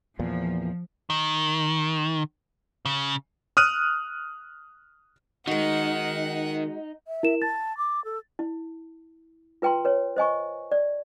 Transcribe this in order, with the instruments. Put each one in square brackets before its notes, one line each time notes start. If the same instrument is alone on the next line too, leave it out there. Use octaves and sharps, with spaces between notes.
[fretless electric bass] E2 A#2 [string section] F3
[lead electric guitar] D#3
C#3
[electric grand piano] D#6 F6 F#6 D#7
[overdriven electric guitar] D#3 [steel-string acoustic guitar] G#3 F#4 [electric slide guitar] D#4 [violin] F#5
[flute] E5
[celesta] E4 A#4 E7
[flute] A5 [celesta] A6
[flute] D6
A4
[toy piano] E4
F4 B4 G5 A#5 C6
B4 C#5
C5 D#5 G#5 C#6
D5